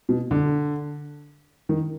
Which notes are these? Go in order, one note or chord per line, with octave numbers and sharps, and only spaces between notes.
B2
D3
D#3